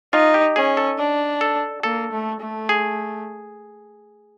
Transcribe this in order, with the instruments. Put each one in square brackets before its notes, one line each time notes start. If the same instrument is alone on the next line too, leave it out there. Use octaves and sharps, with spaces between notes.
[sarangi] D#4 [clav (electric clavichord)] F4
[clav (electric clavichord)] G4
[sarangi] C#4 [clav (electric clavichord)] G#4
[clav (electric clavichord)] A4
[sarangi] D4
[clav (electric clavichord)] A4
[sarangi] A#3 [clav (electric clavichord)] A4
[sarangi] A3
A3
[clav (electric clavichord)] G#4